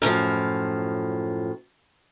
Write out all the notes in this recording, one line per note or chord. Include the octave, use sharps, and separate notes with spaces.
F#2 A2 E3 F3